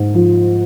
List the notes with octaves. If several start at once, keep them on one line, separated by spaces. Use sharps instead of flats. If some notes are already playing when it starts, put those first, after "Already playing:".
Already playing: G#2
F3